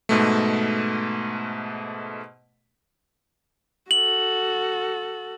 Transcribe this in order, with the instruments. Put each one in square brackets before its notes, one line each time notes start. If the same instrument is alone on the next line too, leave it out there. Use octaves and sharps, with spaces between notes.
[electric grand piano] G#2 B2 A3
[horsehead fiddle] F#4 A4 [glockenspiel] F#7